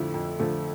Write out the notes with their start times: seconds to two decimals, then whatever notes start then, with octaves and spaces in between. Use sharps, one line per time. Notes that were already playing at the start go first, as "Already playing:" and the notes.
Already playing: F2 D3 F3 A3 E4
0.14 F2
0.39 D3 F3 A3